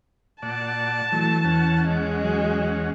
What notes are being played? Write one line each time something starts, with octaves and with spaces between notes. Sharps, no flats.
A#2 D5 F#5 A5
E3 F#3 A3
E2 C#4 F#5
G#3
F#3